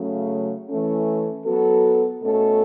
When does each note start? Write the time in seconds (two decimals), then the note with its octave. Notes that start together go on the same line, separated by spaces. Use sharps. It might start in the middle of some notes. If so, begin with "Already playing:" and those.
Already playing: C#3 F#3 A3
0.68 E3 A3 C#4
1.45 F#3 B3 F#4 A4
2.22 B2 A3 C#4 A4